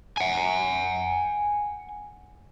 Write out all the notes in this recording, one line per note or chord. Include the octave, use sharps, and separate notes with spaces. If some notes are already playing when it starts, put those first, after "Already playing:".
F#5 G#5